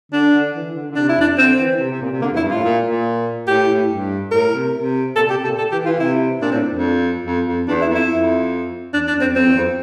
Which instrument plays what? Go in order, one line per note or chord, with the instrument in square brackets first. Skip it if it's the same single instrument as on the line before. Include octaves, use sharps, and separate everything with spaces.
[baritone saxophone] D3 [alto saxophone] D4
[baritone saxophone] D3
E3
D3
D3
[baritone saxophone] C3 [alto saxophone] D4
[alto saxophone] E4
[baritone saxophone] F2 [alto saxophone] D4
[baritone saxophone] D3 [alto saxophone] C4
[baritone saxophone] E3
C3
C3
A#2
C3
[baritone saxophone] D3 [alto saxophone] A#3
[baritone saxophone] E2
[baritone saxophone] F2 [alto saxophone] E4
[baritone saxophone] G2
[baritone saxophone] A2 [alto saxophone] F4
[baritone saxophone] A#2
A#2
[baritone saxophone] A2 [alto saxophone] G4
[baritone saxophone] A2
G2
[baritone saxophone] A2 [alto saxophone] A#4
[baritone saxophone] C3
C3
[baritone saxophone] A#2 [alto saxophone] A4
[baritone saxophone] C3
[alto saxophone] G4
[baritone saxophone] C3
[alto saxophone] A4
[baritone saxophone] A#2
[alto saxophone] A4
[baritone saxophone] E3 [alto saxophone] G4
[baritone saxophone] E3 [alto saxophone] F4
[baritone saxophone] C3 [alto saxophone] E4
[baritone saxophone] A#2 [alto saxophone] D4
[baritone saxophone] A2 [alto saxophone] C4
[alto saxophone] D4
[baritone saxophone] F2
F2
F2
[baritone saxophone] E2 [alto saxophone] D4
[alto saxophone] E4
[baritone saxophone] F2
[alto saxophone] E4
[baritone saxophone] F2
[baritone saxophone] E2 [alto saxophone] D4
[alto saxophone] D4
[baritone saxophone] F2
[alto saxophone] C4
[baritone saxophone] F2 [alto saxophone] C4
[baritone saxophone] E2
F2